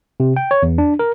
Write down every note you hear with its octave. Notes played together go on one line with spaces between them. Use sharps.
C3
G5
C#5
E2
D4
A#4